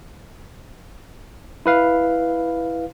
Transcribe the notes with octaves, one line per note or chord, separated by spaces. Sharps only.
E4 B4 F5